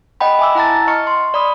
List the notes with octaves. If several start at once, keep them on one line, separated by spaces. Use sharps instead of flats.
D#5 F#5 G5 B5
E5 G#5 D6 E6
E4 F#5 A5 A#5 A6
D#5 C#6 F6 C#7
C6
D5 B5 D#6